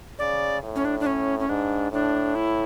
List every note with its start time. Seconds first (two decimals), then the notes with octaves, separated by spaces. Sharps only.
0.19 C#3 D5
0.63 A2
0.76 C#4
0.85 D4
1.00 D4
1.06 C#4
1.39 C#4
1.49 G#2 D4
1.92 A2 D4
2.35 E4